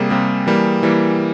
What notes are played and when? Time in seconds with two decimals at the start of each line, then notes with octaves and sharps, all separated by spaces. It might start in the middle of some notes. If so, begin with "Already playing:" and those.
Already playing: C3 G3 A#3 G#4
0.10 C3 G3 A#3
0.47 E3 G3 A#3
0.83 E3 G3 A#3